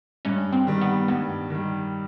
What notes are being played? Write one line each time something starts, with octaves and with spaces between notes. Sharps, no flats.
G2 C#4
C4
D#3 G3
B3
G2 B3
D#3 G3